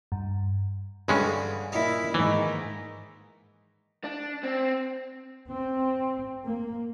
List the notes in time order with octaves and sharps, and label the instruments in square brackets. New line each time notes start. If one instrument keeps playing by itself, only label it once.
[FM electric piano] G2
[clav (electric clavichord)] G2 G#3 C#4 [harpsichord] D3 E3
[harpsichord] A#2 D#4 [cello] E4
[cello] G#2 D#3 [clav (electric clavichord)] E3
[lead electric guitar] D4
C4
[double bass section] C4
A#3